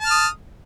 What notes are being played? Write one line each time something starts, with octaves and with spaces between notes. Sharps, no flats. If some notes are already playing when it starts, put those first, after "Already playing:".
A5 D#6 F6